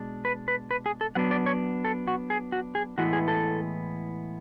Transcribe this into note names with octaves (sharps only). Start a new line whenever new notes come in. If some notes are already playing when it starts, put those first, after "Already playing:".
Already playing: B2 G#3 D4
B4
B4
B4
G#4
A4
F#3 B3 D4 F#5
D5
C#5
A4
F#4
G#4
F#4
G#4
A2 E3 G#3 B3 E4 F#4
G#4
A4